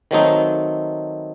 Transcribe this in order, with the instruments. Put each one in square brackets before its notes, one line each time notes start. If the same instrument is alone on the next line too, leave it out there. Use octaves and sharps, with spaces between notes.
[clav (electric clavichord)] D#3 F#3 A3 C4 D#4